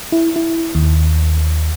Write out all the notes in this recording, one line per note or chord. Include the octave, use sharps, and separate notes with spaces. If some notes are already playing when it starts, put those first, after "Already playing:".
E4
E4
D#2